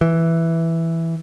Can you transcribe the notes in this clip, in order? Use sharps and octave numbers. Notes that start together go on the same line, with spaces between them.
E3